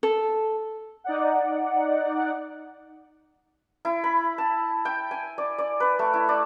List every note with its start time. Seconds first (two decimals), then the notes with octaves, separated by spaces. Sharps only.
0.03 A4
1.04 D#4 D5 F#5
3.85 E4
4.04 B5
4.38 A5
4.85 G5
5.11 G#5
5.38 D5
5.58 D5
5.80 B4
5.99 A3
6.14 E4
6.29 D5